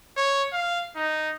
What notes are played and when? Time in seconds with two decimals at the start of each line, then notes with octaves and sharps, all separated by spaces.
0.17 C#5
0.53 F5
0.96 D#4